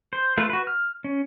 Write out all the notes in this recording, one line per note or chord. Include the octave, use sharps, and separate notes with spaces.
C5
A3 F4 B4
F#4 B4
F6
C#4